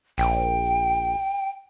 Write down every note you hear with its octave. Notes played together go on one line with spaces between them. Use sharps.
A#1 G5